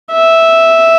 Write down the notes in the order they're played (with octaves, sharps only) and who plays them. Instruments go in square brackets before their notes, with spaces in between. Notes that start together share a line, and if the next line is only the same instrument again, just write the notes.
[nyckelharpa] E5